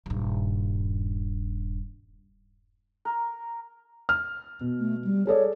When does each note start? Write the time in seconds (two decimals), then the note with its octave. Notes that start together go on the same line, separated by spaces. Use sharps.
0.06 D#1 G2
3.05 A#4
4.09 F6
4.61 B2
4.80 A3
5.05 G3
5.27 G#4 A4 C#5 D5